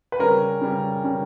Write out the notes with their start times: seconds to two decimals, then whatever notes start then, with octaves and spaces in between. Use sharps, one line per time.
0.12 B4
0.19 C#3 G3 C#4 A#4
0.61 C#3 G3 C#4
1.04 C#3 G3 C#4